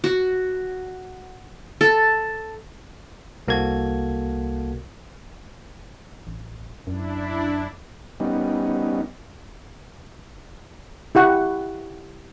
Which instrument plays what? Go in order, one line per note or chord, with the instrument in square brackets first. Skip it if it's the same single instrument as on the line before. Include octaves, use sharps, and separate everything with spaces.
[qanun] F#4
A4
[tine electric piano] C2 A#3 F#4 A4 G#6
[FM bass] A1
[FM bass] F#2 [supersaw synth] D4 E4
[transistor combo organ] G3 B3 C#4 D#4
[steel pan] E4 G4 F#5 C#6